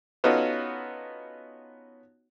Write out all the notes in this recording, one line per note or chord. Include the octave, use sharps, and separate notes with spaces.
B3 C#4 D#4 F4 F#4 A4